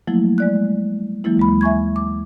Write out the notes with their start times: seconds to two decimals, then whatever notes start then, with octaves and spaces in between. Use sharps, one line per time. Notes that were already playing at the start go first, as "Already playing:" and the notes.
0.07 F3 F#3 A3 A#3 E4
0.38 G#3 D5 F#6
1.24 E3 F#3 G#3 A#3 E4
1.37 D#2 G#3 B5
1.61 E5 G#5 C#6 G#6
1.96 D6